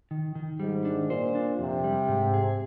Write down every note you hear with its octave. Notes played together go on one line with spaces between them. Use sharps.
D#3
D#3
G#2 G3
D4
A#2 C5
D4
F2 C3
G3
G#2
G#4